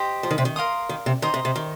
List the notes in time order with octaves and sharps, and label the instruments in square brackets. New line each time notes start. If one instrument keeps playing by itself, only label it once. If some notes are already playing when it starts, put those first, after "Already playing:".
Already playing: [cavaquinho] G4 C5 D#5
[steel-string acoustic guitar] F3
D#3
C3
D#3
[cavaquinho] A#4 F5 C6 D#6
[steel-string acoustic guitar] D#3
C3
[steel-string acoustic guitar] D#3 [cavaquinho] C5 D#5 A#5 D#6
[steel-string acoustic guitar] C3
C3
D#3